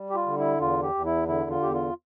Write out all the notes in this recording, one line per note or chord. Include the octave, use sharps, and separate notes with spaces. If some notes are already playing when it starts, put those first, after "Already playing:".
Already playing: G3
G4
F4
D3
E4
E2 F4
G4
E2
E4
D3 E4
F4
E2 G4
F4